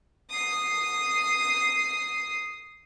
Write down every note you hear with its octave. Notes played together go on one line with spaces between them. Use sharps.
D#6 C7